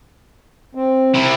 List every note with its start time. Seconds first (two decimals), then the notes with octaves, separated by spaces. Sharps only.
0.75 C4
1.14 C3 E4